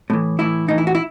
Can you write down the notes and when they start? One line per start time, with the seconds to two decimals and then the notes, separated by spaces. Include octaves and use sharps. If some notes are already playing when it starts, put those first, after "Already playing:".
0.10 A2 E3
0.39 A2 E3 E4
0.68 A2 E3 D#4
0.78 E4
0.87 F#4
0.95 E4